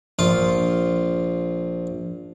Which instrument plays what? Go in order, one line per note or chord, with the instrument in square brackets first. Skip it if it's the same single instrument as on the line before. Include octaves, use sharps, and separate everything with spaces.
[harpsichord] A#1 F4 F5